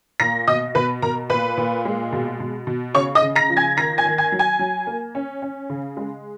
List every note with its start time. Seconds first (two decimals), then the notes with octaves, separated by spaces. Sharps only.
0.20 A#2 A#5 A#6
0.48 B2 D#5 D#6
0.75 B2 B4 B5
1.02 B2 A#4 A#5
1.30 A#2 B4 B5
1.57 A#2
1.85 G#3
2.13 B2
2.40 B2
2.67 B2
2.95 C#3 C#5 C#6
3.15 D#5 D#6
3.22 C#3
3.36 A#5 A#6
3.50 F3
3.57 G#5 G#6
3.77 D#3 A#5 A#6
3.98 G#5 G#6
4.05 D#3
4.18 G#5 G#6
4.32 F#3
4.39 G#5 G#6
4.59 F#3
4.87 A#3
5.15 C#4
5.42 C#4
5.70 C#3
5.97 G#3